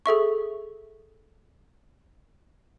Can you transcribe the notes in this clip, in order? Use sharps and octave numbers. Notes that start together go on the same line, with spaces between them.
G#4 A4 E5 C#6